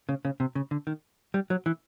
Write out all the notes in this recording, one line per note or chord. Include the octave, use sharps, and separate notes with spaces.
C#3
C#3
C3
C#3
D3
D#3
G3
F#3
E3